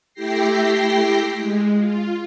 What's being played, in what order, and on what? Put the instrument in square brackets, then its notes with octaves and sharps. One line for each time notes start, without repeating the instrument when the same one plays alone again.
[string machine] A3 E4 G4 G5 A#6 C7
G#3
F4